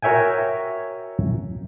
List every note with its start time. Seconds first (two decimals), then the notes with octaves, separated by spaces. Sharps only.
0.02 F#4 A#4 C#5 E5 G5 G#5